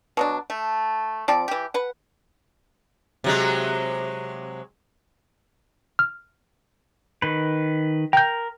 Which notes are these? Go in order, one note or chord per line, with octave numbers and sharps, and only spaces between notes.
B2 F#3 D4
A3
F3 C4 D5
E3 G4
B4 F#5
C3 F#3 G#3
F6
D#3 B4
A#4 G5 G6